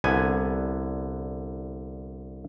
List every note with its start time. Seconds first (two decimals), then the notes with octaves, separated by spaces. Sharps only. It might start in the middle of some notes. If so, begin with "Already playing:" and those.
0.04 C2 D3 B3 G#5